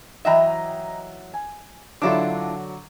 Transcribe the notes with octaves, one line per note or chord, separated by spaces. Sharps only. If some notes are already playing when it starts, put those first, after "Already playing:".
E3 F#3 D#5 E5 G5 A#5
G#5
D3 F#3 D4 E4 F4 D6